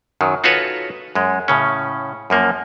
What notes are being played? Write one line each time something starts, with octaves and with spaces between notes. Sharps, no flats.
F#2 D#3 F#3
D#4 F4 F#4 A4 B4 C#5
F#2 G#3
A2 C#3 C#4
F#2 F3 A#3